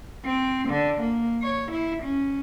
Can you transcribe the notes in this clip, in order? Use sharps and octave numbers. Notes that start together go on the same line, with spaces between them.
C4
D3
A#3
C#5
E4
C#4